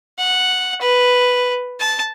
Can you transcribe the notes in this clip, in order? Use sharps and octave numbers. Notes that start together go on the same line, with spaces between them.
F#5
B4
A5